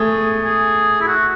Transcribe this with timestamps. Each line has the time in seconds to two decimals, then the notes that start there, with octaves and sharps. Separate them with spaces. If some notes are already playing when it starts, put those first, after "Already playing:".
Already playing: A3 G#4
0.44 G#4
1.01 E4
1.07 F#4